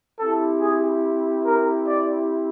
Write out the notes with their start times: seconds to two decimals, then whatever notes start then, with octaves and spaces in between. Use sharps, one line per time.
0.19 C4 E4 G4 A4
0.61 G#4
1.45 A#4
1.87 D5